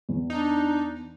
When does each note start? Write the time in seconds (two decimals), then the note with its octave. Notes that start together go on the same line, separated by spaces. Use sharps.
0.09 E2
0.30 D4 D#4